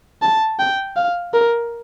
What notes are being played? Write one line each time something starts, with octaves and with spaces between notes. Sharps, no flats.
A5
G5
F5
A#4